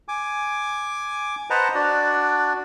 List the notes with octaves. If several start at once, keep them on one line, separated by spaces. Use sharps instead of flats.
G#5 D6
B4 C5 D#5 F#5 A5 A#5
D4 F#4 D5